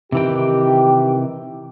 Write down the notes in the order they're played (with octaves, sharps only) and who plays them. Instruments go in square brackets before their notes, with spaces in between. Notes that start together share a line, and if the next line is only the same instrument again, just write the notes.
[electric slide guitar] C3 E3 G5 [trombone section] D#3 G4